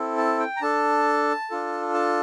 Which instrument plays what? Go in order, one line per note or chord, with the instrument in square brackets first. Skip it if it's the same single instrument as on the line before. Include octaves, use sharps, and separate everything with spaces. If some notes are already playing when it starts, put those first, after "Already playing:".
Already playing: [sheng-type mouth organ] C4 E4 A4
A5
G5
A#5
D4 A4 A5
D4 F4 A4
A5